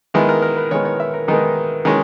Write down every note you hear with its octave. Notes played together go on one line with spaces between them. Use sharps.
D#3 G#3 B3 E4
A#4
A#4
B4
D#3 G#3 B3 C#5
C#5
E5
A#4
D#3 G#3 B3 D#4
D#3 G#3 C#4